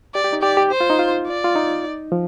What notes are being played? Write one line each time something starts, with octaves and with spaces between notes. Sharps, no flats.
G4 D5
G4
D#4
G4 D5
G4
C5
F4
D#4
F4
D5
F4
D#4
F3